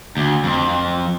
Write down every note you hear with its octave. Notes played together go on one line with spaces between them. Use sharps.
D2
F2